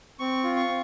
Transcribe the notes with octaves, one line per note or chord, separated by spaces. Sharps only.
C4 C#6
F4
C#6
C4